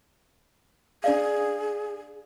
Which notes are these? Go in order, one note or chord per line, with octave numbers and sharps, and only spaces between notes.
D4 G#4 D5 F5